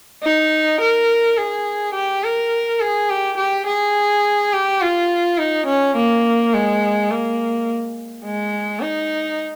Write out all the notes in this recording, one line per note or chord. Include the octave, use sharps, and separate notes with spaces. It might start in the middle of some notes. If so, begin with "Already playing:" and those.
D#4
A#4
G#4
G4
A#4
G#4
G4
G4
G#4
G4
F4
D#4
C#4
A#3
G#3
A#3
G#3
D#4